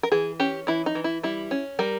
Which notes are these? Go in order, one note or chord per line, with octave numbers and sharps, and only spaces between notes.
A#4
E3 G#4
C#4 G4
E3 E4
D#4
E3
E4
G3 E4
C#4
G3 A#4